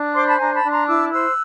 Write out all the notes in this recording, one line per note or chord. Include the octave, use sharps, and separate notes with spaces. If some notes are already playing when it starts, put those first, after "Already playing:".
Already playing: D4
C5 C6 D6
A5 B5
D4 G#5 A#5
A5 B5
D4
A#5 C6
E4 D6 E6
C5 E6 F#6